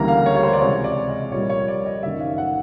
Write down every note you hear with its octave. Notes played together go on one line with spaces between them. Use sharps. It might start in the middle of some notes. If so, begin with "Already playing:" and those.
Already playing: D2 C#3 E3 G3 A#3 A#5
F5
C#5
C#5
C5
D5
C#2 C3 E3 G#3 C#5
D5
D#5
A#1 A#2 G3 A#3 C#5
C#5
D5
D#5
F#1 F#2 D#3 E5
F5
F#5